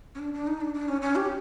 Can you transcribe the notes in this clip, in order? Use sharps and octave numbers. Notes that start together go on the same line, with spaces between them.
C#4
D4
D4
D#4
D4
D4
C#4
C#4
G4